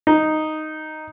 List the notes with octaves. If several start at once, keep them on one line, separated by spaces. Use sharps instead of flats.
D#4